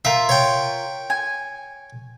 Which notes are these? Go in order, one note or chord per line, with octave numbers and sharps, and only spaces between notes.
F4 A#4 E5
C#5 G5
G#5